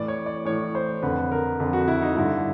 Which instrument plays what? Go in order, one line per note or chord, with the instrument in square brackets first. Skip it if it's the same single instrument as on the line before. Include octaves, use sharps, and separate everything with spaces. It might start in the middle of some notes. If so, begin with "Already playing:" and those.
Already playing: [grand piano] A2 E3 D5
C#5
D5
A2 E3 C#5
C5
F2 D3 B4
A#4
F2 D3
F#4
E4
D#4
G2 D3 E4